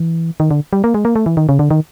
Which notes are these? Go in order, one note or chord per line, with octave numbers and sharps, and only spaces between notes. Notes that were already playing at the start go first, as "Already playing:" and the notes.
Already playing: E3
D#3
D3
G3
A#3
G#3
A#3
A3
E3
D#3
C#3
D3
D#3